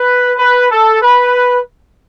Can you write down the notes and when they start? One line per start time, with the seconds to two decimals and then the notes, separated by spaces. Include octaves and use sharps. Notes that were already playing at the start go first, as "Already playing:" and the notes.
Already playing: B4
0.38 B4
0.71 A4
1.02 B4